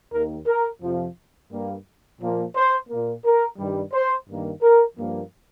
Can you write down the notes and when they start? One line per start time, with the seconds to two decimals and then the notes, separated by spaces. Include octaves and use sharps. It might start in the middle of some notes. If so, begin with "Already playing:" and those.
0.13 D#2 D#3 A#3 A#4
0.47 A#4
0.82 F2 C3 F3
1.52 G2 G3 A#3
2.20 A#2 F3 A#3
2.56 C5
2.90 A#2 A#3
3.25 A#4
3.58 G2 D#3 G3
3.93 C5
4.29 G2 D#3 A#3
4.62 A#4
4.97 G2 F3 A#3